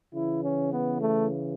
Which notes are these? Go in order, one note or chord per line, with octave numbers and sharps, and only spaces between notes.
C#3 E3 E4
C#4
B3
A3